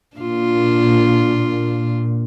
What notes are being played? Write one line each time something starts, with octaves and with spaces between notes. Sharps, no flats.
A#2 D4 F4